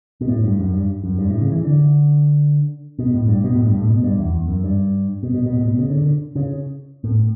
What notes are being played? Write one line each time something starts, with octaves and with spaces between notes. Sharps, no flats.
B2
A2
G2
F#2
G2
F#2
G2
A2
C#3
E3
D3
B2
A2
G2
B2
A2
G2
A2
B2
G2
E2
E2
F#2
G2
B2
B2
B2
A2
B2
C#3
D3
D3
C#3
A2